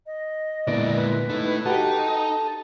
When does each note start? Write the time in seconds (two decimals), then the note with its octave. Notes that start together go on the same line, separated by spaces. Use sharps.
0.06 D#5
0.67 A#2 D3 G#3 B3 E4 D5
0.95 B4
1.29 A3 D#4 E4
1.65 D#4 F#4 G4 A4 A5